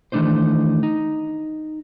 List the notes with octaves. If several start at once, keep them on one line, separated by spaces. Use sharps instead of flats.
D#3 E3 A3 D4 D#4 C5
D#4